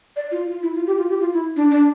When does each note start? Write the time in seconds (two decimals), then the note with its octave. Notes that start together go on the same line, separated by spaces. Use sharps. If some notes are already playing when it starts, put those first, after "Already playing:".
0.16 D5
0.32 F4
0.47 F4
0.63 E4
0.75 F4
0.87 G4
0.98 F4
1.09 G4
1.21 F4
1.33 E4
1.56 D4
1.71 D4